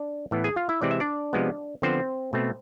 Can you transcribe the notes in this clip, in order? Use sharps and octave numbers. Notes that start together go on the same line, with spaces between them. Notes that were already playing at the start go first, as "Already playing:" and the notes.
Already playing: D4 D5
A2 E3 B3
G#4 G#5
F4 F5
E4 E5
C3 E3 G#3 C4 D5
E5
D4 D5
C3 F3 G#3 B3
D3 F3 B3 C4 C5
B2 A3 C4